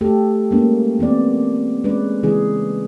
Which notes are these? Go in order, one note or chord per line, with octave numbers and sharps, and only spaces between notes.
A3 G4 A4
G#3 A#3 C#4
E3 B3 C4 D5
G#3 C#4 B4 D5
C#3 E3 G#3 G#4